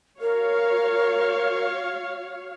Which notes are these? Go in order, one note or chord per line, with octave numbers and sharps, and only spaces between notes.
F#4 A#4 C#5 F5